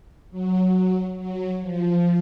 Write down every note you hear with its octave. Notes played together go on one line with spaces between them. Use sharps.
F#3
F#3
F3